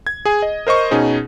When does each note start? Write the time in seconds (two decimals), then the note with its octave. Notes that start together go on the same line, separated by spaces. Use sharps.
0.07 G#6
0.25 G#4 G#5
0.42 D#5
0.67 A#4 C5 D#5 C#6
0.91 B2 C#4 D#4 G#4